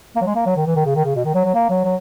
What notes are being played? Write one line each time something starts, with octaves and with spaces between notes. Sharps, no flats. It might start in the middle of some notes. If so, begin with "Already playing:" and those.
A#3
F#3
G#3
A#3
F#3
D#3
E3
D#3
C#3
D#3
C#3
B2
D#3
F#3
F#3
A#3
F#3
F#3